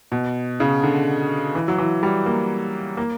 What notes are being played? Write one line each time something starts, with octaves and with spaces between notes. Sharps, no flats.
B2
C#3
D3
E3
F#3
E3
G3
A#3
A#3